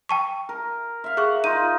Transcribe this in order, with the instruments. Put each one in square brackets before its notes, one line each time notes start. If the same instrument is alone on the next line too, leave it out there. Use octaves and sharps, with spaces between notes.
[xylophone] G5 A5 C#6
[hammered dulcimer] A#4
E5 F5
[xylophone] G#4 C#6 [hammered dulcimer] F#5
[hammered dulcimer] D#4 F4 [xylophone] D#7